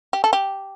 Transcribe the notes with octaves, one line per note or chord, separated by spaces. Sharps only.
G4
A4
G4